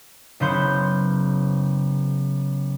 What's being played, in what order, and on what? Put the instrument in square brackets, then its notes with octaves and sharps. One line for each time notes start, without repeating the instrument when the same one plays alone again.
[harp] F#1 C#3 B3 C#4 C5 G6